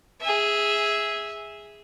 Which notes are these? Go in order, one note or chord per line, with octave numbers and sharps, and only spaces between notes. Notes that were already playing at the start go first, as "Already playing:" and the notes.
G#4 E5